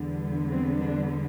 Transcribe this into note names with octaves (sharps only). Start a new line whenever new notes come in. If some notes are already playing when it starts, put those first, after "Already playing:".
Already playing: E2 D3 G3 B3
C4
D4